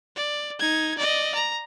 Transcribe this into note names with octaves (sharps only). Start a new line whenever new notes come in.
D5
D#4 G#6
D5 D#5
A#5